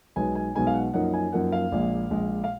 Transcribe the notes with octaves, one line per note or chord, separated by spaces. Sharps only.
B1 B2 G#3 B3 D#4 G#5
G#5
B1 B2 G#3 B3 D#4 G#5
F5
F#5
F#2 F3 A#3 D#4 F#5
G#5
F#2 F3 A#3 D#4 F#5
F5
A#1 A#2 G#3
A#1 A#2 G#3
F5